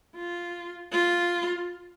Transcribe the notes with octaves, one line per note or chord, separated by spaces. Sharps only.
F4
F4